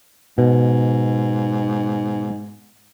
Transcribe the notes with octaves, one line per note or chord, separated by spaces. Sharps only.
G#2 B2